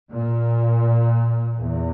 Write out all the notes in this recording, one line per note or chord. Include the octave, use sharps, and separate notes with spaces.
A#2
E2